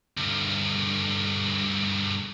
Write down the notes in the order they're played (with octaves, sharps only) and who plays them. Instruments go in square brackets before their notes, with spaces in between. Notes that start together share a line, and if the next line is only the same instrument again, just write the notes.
[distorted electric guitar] D2 G2